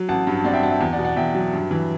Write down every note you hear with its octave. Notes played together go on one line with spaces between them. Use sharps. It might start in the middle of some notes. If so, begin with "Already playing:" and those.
Already playing: F#3
A1 F#5 A5
G2
C4 D5 F#5
E5 G5
F#3 F#5 A5
E5
E2
D5 F#5
B2
D5 F#5
E2 E5 G5
F#3
G2
E3